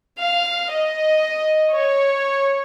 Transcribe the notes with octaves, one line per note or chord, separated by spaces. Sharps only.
F5
D#5
C#5